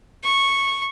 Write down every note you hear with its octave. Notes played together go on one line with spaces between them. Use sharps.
C#6